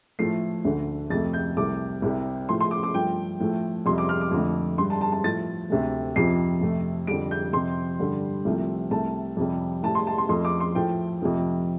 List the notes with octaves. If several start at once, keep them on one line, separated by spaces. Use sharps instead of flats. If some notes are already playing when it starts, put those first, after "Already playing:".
A2 F3 A3 C7
D2 D3 A3
F2 C3 A3 A6
G6
C2 C3 A3 D6
C2 C3 G3
A2 F3 A3 C6
C6
D6
D6
G2 F3 A3 G5
A2 F3 A3
F2 C3 G3 C6
D6
F6
D6
F2 D3 A3
G2 G3 C6
A5
A5
A5
A2 F3 A3 A6
D2 C3 A3
F2 C3 F3 C7
F2 C3 F3 A3
F2 D3 G3 D7
G6
F2 C3 F3 C6
G2 D3 G3
C2 C3 F3 A3
C2 C3 A3 A5
F2 C3 G3
A2 G3 A5
C6
A5
C6
F2 F3 A3 C6
D6
C6
A2 F3 A3 G5
F2 C3 F3 A3